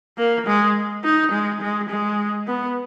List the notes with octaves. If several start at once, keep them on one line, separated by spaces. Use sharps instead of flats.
A#3
G#3
D#4
G#3
G#3
G#3
B3